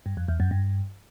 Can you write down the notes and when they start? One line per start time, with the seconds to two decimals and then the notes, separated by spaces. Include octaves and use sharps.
0.06 G2
0.17 F2
0.28 E2
0.40 F#2
0.51 G2